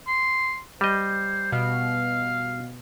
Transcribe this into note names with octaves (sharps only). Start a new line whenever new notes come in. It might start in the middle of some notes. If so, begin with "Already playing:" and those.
C6
G3 C5 D#5
B2 F5